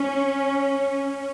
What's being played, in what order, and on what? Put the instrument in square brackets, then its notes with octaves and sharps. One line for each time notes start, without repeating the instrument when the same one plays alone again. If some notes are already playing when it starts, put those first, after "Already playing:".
Already playing: [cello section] C#4